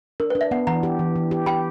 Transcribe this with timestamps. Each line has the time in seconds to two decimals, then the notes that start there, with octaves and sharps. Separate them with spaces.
0.20 D4 A#4
0.30 B4
0.35 D4
0.41 E5
0.51 B3 F#5
0.67 E3 F#5 A#5
0.83 G4
0.99 E3
1.16 E3
1.31 G4
1.46 G4 G5 B5